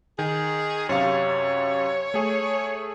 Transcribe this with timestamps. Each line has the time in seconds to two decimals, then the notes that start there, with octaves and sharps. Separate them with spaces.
0.19 D#3 G#4
0.89 F#2 C3 C#5 F5
2.14 A3 G#4